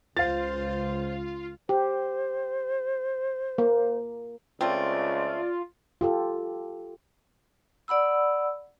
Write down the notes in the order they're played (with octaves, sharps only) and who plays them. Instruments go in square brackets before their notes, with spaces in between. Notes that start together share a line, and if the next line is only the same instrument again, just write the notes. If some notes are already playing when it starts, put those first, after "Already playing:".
[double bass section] C#2 [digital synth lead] F4 [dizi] C5 [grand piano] F5 A6
[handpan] G4 [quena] C5
[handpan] A#3
[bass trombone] C#2 [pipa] A3 C4 [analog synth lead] F4 [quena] D5
[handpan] F4 G4 A4
[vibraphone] D5 F#5 B5 E6